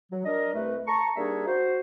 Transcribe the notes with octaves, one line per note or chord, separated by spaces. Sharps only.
F#3
D4 A#4 D#5
C2 A3 B4
A5 A#5 C#6
G3 A#3 D4 D#4 G#4 E5
F#4 C5